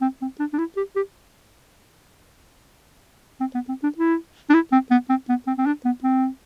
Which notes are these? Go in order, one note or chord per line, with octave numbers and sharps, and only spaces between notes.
C4
C4
D4
D4
E4
G4
G4
C4
B3
C4
D4
E4
D4
E4
C4
B3
C4
B3
C4
C4
D4
B3
C4